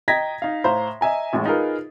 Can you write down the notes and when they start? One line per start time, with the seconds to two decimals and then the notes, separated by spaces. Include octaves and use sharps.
0.08 D#5 G5 A#5 G#6 A#6 B6
0.42 D#4 F5
0.64 A2 C5 F5 A#5 C6
1.01 D#5 E5 G#5 A#5
1.33 A1 A2 G#3
1.46 D#4 F4 G#4 A#4 B4